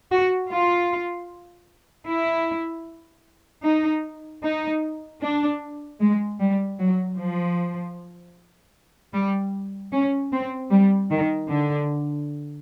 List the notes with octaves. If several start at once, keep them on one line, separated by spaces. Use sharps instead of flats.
F#4
F4
E4
D#4
D#4
D4
G#3
G3
F#3
F3
G3
C#4
C4
G3
D#3
D3